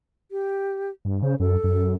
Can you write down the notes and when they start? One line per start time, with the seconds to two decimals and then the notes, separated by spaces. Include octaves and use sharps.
0.31 G4
1.05 G2
1.23 C#3 C5
1.40 F#2 A4
1.64 F#2